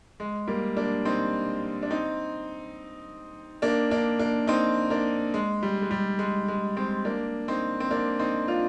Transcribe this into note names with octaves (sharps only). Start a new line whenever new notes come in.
G#3
G3 A#3
A#3 D4
C4 D#4
D4
C4 D#4
A#3 D4
A#3 D4
A#3 D4
C4 D#4
A#3 D4
G#3
G3
G#3
G3
G#3
G#3
G#3 C4
A#3 D4
C4 D#4
C4
A#3 D4
C4 D#4
D4 F4